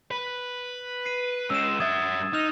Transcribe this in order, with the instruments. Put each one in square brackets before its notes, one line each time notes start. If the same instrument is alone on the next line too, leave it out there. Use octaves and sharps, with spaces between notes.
[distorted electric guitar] B4
[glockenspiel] C7 D#7
[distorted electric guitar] G#3 C#4 [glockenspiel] E6 E7
[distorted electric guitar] F#2 E5 [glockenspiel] D#6 G#6 A6
[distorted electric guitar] D#4 [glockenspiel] D#6 F6 F7